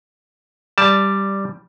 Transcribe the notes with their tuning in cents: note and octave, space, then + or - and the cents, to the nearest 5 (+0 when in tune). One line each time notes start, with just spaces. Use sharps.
G3 +0 D5 +0 A5 +0